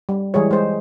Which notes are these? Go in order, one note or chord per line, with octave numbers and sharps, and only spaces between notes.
G3
E3 G3 G#3 G#4 C#5
G#3 C5